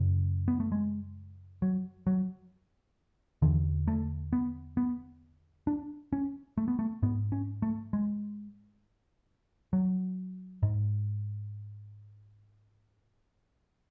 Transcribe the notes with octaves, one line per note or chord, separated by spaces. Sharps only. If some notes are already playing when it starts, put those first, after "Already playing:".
Already playing: F#2 C#3
B3
A3
G#3
F#3
F#3
E2 D3 E3
A3
B3
B3
D4
C#4
A3
B3
A3
G#2 B3
C#4
A3
G#3
F#3
G#2